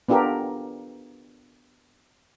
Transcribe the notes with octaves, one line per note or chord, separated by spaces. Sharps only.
B3 D4 F4 G4 A4 A#4